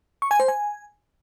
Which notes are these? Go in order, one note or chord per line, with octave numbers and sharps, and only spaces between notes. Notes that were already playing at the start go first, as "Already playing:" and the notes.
C#6
G#5
C5
G#5